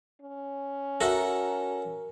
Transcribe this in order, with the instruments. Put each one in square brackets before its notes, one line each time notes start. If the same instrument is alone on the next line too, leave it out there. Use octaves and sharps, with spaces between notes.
[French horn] C#4
[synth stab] F#4 A#5 [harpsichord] A4 E5 F#5 [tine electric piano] A#4